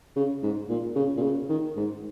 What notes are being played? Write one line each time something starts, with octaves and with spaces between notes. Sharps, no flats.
C#3
G#2
A#2
C#3
A#2
C#3
D#3
G#2